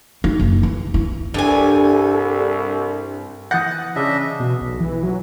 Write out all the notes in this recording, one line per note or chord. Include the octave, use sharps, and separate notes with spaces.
D#4
F#1
E3
E4
C2 G2 G3 A4 G#5
E3 F#5 D#6 G6 A6 A#6
C#3 D4 D#5 E5
B2
B1
E3
F#3